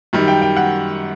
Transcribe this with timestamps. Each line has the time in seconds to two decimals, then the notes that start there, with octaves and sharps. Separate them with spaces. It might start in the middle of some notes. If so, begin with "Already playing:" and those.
0.13 F#2 D#3 G3
0.28 G5
0.42 G5
0.57 F#5